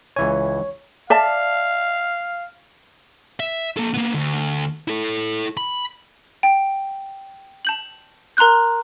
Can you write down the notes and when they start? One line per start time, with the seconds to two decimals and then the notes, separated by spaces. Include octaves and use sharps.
0.16 C#2 E3 C#5 G#5
1.10 D5 E5 F5 A5
3.40 E5
3.77 A#3 A4
3.94 A#3 B3
4.14 D2
4.88 E4 A4
5.57 B5
6.43 G5
7.65 A5 G6 F#7
8.37 A#4 A#5 C6 F#6 G6